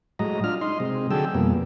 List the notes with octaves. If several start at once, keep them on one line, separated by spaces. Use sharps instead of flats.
A2 F#3 G#3 D#5 A#5
D4 F4 F6
D#4 D#5 C6
C3 G#3
D3 F#3 G#4 A4 G5 E6
F2 B2 G3 A#3